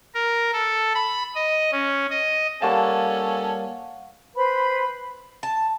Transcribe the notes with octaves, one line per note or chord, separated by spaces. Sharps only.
A#4
A4
B5
D#5
C#4
D#5
G3 A#3 C#4 A4 F5 F#5 A5 C#6
B4 C5 B5
A5